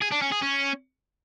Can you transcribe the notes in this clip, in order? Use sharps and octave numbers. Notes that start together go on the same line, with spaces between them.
G#4
D4
C#4
G#4
C#4